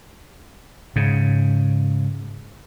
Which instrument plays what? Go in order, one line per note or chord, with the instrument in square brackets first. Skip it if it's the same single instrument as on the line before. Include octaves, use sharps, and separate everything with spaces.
[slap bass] G#2 C#3